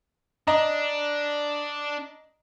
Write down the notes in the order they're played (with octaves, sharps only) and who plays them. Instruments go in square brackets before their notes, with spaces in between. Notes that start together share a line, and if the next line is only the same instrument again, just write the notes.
[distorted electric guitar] D4 [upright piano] D#5 A#5